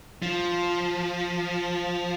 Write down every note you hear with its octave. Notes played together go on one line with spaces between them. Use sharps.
F3